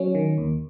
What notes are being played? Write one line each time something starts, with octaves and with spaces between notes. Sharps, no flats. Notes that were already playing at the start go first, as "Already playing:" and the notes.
Already playing: F#3 C#4
D#3
D#2